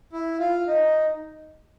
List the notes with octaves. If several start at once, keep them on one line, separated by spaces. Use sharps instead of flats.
E4
F4
D#4